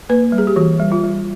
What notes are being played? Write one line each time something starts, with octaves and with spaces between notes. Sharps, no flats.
A#3 B4
G3
G#4
G4
E3 F#4
G3
F4
G3